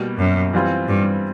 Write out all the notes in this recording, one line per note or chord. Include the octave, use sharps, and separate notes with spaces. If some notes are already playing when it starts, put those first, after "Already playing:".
Already playing: B2 G3 A#3
F#2
E3 G3 C4 F4
G2